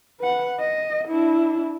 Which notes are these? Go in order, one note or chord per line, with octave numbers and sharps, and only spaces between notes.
B4 F#5
D#5
D4 E4